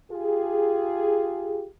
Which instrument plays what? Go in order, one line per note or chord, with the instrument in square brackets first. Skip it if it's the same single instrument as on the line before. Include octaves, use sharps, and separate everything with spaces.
[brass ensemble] F4 G4 G#4